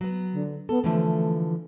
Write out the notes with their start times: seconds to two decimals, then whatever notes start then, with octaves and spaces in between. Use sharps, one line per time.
0.01 F#3 B3
0.33 D3
0.69 B3 A4
0.84 D3 E3 F3 A3